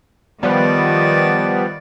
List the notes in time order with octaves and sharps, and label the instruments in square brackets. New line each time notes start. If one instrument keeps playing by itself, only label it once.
[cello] D#3 D5 [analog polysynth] F3 G3 B3